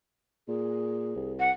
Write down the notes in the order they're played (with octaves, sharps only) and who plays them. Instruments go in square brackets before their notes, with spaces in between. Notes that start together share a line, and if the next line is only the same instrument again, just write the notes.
[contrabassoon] A#2 [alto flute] G#4
[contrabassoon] C2
[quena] F#5